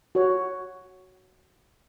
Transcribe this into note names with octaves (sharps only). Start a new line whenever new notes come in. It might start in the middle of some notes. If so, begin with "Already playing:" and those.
F#4 C#5